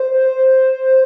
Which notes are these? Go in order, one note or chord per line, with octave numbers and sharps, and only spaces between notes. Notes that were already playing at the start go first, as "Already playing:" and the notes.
Already playing: C5